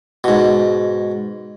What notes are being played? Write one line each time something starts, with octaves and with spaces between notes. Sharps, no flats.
G#2 B2